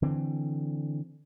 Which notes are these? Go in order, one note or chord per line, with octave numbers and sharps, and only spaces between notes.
D3 E3 C4